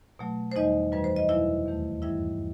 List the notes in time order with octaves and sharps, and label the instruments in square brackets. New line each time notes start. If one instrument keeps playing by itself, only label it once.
[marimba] B2 F#3 A3
C5
E2 D#3 G3 D#4 D#5
F#2 E3 G3 B4
C5
D#5
E2 B2 F#3 E4 E5
D#2 D#3 A3
G2 E3 G3 E4 E5